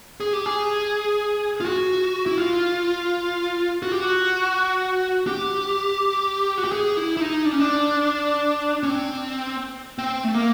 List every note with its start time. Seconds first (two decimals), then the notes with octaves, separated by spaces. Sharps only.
0.20 G#4
0.33 G4
0.46 G#4
1.60 F4
1.65 F#4
2.26 E4
2.38 F4
3.82 F#4
3.92 G4
4.01 F#4
5.27 G4
6.58 F#4
6.65 G4
6.72 G#4
6.97 E4
7.17 E4
7.20 D#4
7.45 D4
7.52 C#4
7.60 D4
8.83 C#4
8.90 C4
9.98 C4
10.24 A3
10.35 A#3